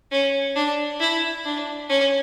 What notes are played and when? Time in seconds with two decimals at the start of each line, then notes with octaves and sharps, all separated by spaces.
0.11 C#4
0.56 D4
1.00 E4
1.45 D4
1.89 C#4